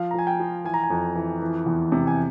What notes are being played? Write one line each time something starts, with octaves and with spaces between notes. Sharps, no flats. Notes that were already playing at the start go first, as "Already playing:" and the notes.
Already playing: F3 F5
A#5
F3 G#5
G5
F3
E3 G#5
A#5
G#5
F2
E3
E3
E2
C3
G#5